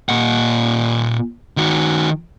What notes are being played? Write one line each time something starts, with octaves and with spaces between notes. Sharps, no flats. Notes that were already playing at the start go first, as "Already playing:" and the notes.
A#2 F#5
D#3 F#4